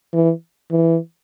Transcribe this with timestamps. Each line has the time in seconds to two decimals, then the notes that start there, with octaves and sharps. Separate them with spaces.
0.13 E3
0.71 E3